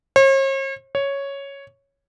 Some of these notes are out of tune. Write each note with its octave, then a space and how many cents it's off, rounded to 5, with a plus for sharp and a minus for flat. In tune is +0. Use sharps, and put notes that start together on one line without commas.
C#5 -45
C#5 +0